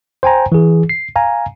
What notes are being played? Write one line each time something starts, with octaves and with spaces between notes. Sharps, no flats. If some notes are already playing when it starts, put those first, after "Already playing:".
C5 G5 G#5 A#5
E3 G#4
C7
F5 G#5 A#5